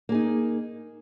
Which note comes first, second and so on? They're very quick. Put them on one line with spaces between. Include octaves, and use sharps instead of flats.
A#3 G#4 D#4